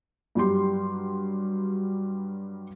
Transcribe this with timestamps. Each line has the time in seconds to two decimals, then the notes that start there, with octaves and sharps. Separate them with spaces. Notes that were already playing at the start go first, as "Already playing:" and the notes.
0.35 G2 F#3 G3 G4 C6